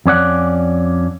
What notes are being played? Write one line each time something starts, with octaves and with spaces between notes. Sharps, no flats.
F2 C#4 D5 F#5